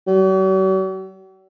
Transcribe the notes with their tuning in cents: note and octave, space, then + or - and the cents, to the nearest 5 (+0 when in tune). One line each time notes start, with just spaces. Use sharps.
F#3 +45